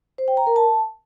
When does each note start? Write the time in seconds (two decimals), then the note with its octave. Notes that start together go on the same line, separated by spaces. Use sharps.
0.18 C5
0.28 G5
0.37 A#5
0.47 A#4
0.56 A5